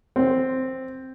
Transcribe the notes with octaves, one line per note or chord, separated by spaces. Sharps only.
C4